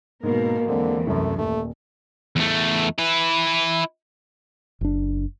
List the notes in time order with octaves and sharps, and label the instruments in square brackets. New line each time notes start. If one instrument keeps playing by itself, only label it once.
[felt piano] G#2 [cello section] B2 A#4 [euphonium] A#3
[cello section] E2 E3 [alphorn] D3 [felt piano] G#3 C4
[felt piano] C2 F#2 [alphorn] A3
[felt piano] D#1 [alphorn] A3
[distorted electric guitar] E2 A3
E4 B4
[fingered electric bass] F#1 D4